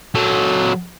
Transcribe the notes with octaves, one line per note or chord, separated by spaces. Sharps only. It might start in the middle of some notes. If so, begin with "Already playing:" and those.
F#3 A4